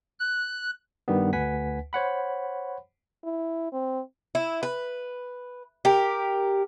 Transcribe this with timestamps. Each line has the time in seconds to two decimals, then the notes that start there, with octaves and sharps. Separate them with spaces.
0.19 F#6
1.08 G2 D#3 G3 B3
1.33 D2 B4 F#5 G#5 B6
1.93 C5 C#5 F#5 B5
3.24 E4
3.72 C4
4.35 E4
4.63 B4
5.85 G4 A#4